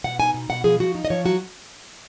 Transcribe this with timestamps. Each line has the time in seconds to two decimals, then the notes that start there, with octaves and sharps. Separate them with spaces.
0.04 B2 F#5
0.19 D#4 G#5
0.34 B2
0.49 B2 F#5
0.64 F3 G#4
0.80 F3 F#4
0.95 D#4
1.05 D#5
1.10 F3 C#5
1.25 F#3 F#4